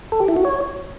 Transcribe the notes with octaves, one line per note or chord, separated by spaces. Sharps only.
A4
G4
E4
F#4
C#5